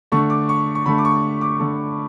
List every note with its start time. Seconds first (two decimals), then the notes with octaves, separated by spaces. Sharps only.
0.12 D3 A3 C#6
0.30 D6
0.49 C#6
0.75 C#6
0.86 D3 A3 B5
0.98 D6
1.05 C#6
1.41 D6
1.59 D3 A3